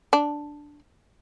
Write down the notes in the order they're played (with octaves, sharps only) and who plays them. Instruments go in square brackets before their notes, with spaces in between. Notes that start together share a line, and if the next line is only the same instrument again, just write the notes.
[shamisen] D4